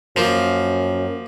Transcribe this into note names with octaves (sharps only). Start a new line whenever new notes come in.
F#2 F3 A#3